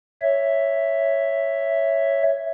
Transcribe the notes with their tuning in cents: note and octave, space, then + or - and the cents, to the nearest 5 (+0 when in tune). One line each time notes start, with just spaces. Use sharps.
C#5 +0 E5 +0